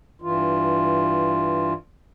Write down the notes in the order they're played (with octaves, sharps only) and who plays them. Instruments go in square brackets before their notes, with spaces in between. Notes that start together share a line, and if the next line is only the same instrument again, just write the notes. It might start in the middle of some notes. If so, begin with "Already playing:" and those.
[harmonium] G2 E3 F4